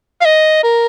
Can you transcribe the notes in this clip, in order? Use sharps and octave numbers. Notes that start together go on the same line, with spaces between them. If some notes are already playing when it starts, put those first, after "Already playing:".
F5
D#5
A#4